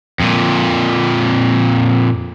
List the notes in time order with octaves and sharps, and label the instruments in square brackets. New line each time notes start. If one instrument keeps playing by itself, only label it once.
[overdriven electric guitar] F2 A#2